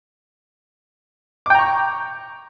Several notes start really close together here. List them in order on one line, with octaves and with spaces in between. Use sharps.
D6 G5 A#5 C#6